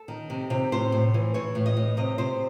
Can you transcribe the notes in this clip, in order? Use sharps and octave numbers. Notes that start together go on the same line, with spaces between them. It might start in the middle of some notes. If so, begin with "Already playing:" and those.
Already playing: A4
D#3
C3
C3
A2 C5
A2
E3
E3 C#5
A2
D#5
A2
C3 D#5
C3 C5